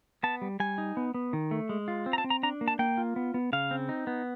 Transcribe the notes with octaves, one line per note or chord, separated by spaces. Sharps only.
B3 A5
G3
G3 G#5
D#4
B3
B3
D#3
A3
G#3
F4
C4
A#5
A5
C4
A#5
D4 A#5
A#3
A5
A#3 G5
F4
B3
B3
C#3 F5
C4
D#4
B3